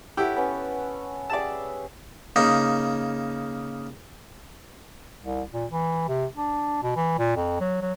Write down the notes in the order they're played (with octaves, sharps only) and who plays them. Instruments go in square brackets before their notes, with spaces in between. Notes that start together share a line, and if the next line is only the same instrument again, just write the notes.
[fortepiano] E4 G4 [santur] A4 C#5 F#5
[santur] B3 C#4 B4
[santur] G4 G#4 E5 [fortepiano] D5 A5
[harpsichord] C#3 A#3 D#4
[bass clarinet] C2
A#2
E3
C3
D4
B2
E3
A#2
F2
F#3
F#3